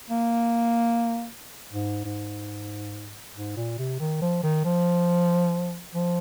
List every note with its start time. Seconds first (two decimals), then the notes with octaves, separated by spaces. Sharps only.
0.10 A#3
1.72 G#2
2.05 G#2
3.35 G#2
3.57 A#2
3.78 C3
4.00 D#3
4.22 F3
4.43 D#3
4.65 F3
5.95 F3